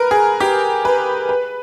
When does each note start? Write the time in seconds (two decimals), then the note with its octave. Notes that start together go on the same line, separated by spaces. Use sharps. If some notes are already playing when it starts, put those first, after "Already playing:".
Already playing: A#4 B4
0.11 G#4
0.40 G4
0.85 B4
1.29 B4